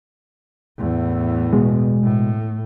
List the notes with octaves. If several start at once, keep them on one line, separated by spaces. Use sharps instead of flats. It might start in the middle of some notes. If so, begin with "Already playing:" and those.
E2 A2
B2 G#3
A2